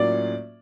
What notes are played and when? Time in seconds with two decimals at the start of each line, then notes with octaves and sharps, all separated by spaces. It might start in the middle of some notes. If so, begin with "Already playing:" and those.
Already playing: A2 F#3 A#3 C#4 F4 D5